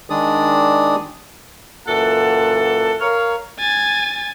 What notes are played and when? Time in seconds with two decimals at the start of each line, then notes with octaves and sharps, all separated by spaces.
0.10 D#3 G#3 D4 D5 D#6
1.87 F#2 A#2 E3 A4 F#5 A5
3.00 A#4 C#5 F5
3.60 G#5 A6